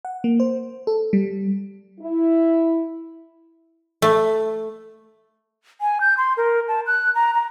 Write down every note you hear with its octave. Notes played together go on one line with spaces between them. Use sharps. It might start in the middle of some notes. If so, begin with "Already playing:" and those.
F#5
A#3
C5
A4
G3
E4
A3
G#5
G6
C6
A#4
A5
F#6
A#5
A#5